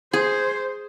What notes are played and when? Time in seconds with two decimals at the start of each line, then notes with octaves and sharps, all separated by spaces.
0.13 G#4 C5